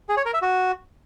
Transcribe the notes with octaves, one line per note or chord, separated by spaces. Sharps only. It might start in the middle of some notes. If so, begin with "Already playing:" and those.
G#4
C#5
A#4
E5
F#4